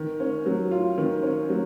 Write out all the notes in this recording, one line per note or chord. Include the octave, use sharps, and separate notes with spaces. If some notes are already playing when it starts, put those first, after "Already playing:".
Already playing: D#3
C#4
F#3
F4
D#3
C#4
F#3